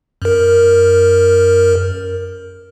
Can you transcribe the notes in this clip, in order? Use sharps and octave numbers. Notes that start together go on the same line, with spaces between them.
F#2 A#4